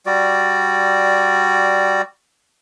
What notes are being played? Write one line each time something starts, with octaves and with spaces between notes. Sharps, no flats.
G3 F#4 D5